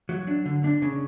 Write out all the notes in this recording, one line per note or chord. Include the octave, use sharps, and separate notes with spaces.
F#3
D4
D3
D4
C#3